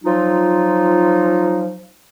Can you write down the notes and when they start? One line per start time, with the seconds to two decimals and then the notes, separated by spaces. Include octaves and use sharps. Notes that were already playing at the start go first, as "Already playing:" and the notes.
0.04 F3 F#3 D#4 F4